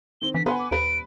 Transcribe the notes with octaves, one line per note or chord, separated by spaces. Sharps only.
D#3 C4 G7
D3 E3 B6
B3 B4 F#5 G#5 C6
D6
D#1 D#2 B4 D7